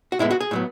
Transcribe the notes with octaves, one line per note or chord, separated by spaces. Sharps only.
F#4
A2 G#3 B3 E4
F#4
G#4
A2 F#3 B3